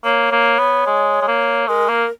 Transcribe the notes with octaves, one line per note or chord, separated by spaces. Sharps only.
A#3 C#5
A#3
B3
G#3
G#3
A#3
G#3 A#4
A#3